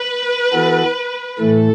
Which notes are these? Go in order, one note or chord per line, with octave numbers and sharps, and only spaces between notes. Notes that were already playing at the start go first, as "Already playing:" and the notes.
Already playing: B4
E3 B3 F#4 A4
A2 E3 A3 A4